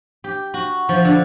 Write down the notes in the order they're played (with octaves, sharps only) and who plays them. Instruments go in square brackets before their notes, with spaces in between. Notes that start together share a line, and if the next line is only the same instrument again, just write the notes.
[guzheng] G4
F#4
F3
D3